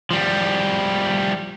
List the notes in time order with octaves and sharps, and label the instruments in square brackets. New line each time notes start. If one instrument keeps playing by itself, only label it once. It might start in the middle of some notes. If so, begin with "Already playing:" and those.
[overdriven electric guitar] F3 G3